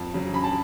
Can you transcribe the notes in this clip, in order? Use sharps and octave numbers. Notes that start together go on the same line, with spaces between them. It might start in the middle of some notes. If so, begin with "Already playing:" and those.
Already playing: F2 A5
C#3 F#3
B5
A5